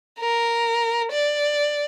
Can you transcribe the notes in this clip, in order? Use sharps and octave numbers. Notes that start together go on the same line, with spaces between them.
A#4
D5